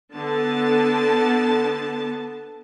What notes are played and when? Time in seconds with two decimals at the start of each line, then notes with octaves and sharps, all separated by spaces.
0.14 D3 B3 A5